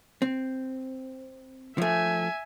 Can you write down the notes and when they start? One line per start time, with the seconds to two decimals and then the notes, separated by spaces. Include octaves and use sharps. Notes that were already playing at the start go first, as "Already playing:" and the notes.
0.22 C4
1.78 F3 A3 E5 G#5